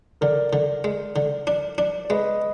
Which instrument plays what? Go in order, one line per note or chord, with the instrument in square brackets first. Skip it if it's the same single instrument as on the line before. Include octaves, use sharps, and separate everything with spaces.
[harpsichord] D3 [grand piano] A#4 D5
[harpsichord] D3
G#3
D3
D4
D4
[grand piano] D5
[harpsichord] G#3 [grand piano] B4 D#5